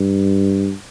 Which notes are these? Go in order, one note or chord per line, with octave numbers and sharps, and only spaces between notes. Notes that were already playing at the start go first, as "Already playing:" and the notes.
Already playing: G2